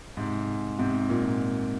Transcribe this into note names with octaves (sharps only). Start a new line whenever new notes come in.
G#2 C3
G#2 C3
A#2
A#2